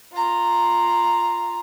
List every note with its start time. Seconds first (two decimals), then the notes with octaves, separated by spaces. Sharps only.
0.13 F4 A#5